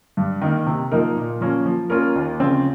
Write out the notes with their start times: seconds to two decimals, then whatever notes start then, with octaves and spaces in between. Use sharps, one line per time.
0.17 G2
0.41 D#3 A#3
0.67 C3
0.91 F3 A#3 D#4 A#4
1.17 A#2
1.40 F3 A#3 C#4
1.65 F3
1.90 A#3 C#4 F4 A#4
2.15 D#2
2.40 C#3 F3 C4